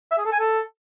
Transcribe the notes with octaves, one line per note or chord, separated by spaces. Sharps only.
E5
G#4
A4
G#5
A4